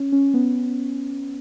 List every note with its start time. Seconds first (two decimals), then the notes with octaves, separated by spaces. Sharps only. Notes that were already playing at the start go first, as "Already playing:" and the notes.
Already playing: C#4
0.12 C#4
0.34 B3